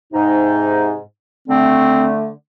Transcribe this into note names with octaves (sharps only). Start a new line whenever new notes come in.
G#2 C3 D#4
D3 A3 C4